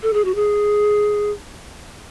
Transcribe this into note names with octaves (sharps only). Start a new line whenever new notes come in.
A4
G#4
F#4
G#4